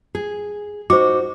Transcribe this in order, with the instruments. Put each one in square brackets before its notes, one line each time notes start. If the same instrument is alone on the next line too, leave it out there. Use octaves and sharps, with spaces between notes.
[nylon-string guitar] G#4
[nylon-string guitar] D#4 F#4 [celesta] C5 D6